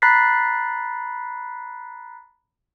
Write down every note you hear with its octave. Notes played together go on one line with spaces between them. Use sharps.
A#5 B5 F#6 A6 B6 C7